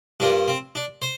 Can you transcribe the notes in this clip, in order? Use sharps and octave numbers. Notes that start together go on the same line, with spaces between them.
G2 F3 A#3 D4
C4
D4
C5